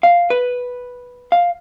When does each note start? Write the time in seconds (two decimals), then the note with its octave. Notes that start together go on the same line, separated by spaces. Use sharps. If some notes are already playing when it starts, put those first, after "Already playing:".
0.03 F5
0.30 B4
1.32 F5